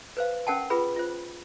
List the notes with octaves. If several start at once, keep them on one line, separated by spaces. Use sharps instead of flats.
B4 C5 F5
C#4 A#4 F#5 G5 A5
F4 G#4 B4 B5
F4 C5